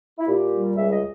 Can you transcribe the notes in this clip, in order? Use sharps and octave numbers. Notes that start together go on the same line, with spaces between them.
E4
A#2 G4
G3
C#2 E5
D#5